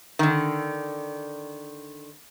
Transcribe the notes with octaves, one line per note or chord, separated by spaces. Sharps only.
D3 D#3